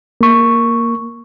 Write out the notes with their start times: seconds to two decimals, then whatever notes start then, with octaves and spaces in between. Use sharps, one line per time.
0.21 A#3 C#6